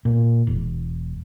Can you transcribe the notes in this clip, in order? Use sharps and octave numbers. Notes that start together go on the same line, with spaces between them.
A#2
E1